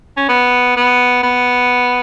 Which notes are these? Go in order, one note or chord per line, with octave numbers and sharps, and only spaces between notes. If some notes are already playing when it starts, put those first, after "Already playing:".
C#4
B3
B3
B3